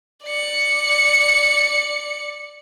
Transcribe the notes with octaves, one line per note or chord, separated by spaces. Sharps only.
D5 C#7